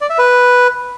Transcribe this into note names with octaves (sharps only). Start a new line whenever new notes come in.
D5
E5
B4